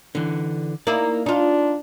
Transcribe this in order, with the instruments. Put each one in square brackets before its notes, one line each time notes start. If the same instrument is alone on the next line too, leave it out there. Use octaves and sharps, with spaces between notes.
[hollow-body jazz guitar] D3 E3
[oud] A#3 D#4 E4 [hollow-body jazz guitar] D5
[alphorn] D4 [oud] D#4 F4